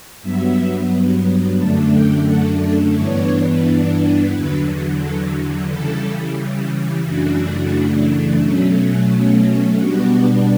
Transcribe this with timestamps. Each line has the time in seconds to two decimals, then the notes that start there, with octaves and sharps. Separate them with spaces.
0.22 G2 F#3 B3 E5
1.58 F#2 D3 A3 D4 A5
1.93 G5
2.27 F#5
2.61 D5
2.94 G2 E3 B3 D4 C#5
4.31 E2 D3 F#3 B4
4.99 A4
5.67 C#3 E3 G3 A4
7.04 F#2 C#3 E3 A3 D4 F#4
8.40 B2 F#3 A3 C#4
9.76 B2 G3 B3 D4 F#4